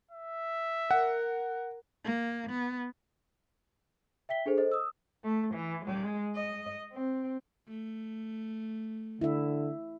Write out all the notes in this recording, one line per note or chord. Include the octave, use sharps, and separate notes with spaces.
E5
A#4 F#5
A#3
B3
E5 G5 B6 G7
D4 G#4 A4 C5
A4 C5 D#5
D#6 E6
A3
E3
G#3
D#5
C4
A3
D3 E4 E5